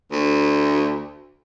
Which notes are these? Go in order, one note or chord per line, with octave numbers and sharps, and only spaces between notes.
D2